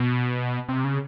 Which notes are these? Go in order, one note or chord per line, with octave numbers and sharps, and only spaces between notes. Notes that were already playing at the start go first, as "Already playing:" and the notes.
Already playing: B2
C3
C#3